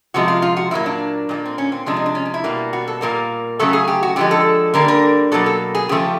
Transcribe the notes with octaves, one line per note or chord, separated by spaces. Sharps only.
C3 F3 G#3 F#4
F4
F4
F#4
A#2 F#3 A#3 E4
D4
A#2 G3 A#3
C4
C#4
C4
C3 F3 G#3 D4
D#4
D4
C#4
D4
E4
B2 G3 A#3
F#4
A4
A#2 G3 A#3 A#4
C#3 F#3 A3 A4
G#4
G4
F#4
D3 F3 G#3 G4
A4
D3 G3 A#3 A#4
A#4
B2 F#3 A#3 A4
A4
G#4
C#3 F3 A3 G4